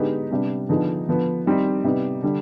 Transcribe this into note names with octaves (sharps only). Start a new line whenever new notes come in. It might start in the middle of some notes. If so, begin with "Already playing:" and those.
Already playing: D3 G#3 B3 D#4 G4
C3 G3 B3 D4
D3 F3 B3 D#4 G#4
D3 F3 B3
D#3 G3 C4 D#4
C3 G3 B3 D#4
D3 G3